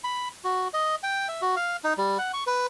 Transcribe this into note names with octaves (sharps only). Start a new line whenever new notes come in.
B5
F#4
D#5
G5
E5
F#4
F5
D#4
G3
F#5
C#6
B4